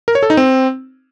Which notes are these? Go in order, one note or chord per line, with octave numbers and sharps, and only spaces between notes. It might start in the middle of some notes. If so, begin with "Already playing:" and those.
A#4
C#5
A4
D#4
C4